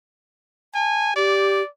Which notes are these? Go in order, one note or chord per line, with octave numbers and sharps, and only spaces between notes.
G#5 A5
G4 D5